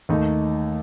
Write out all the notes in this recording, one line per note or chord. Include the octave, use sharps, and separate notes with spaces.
D#2 D#3 A3 D#4